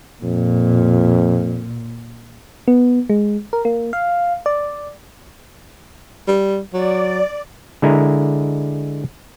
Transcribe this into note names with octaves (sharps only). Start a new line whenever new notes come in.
F2 A#2
B3
G#3
A#4
A#3
F5
D5
G3
F#3 D5
D3 G#3 E4 A#4